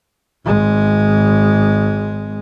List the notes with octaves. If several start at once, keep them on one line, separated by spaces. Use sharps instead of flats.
G#1 G#3